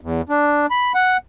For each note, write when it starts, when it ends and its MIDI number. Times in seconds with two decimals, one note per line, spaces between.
0.01 0.22 40
0.29 0.66 62
0.71 0.92 83
0.94 1.17 78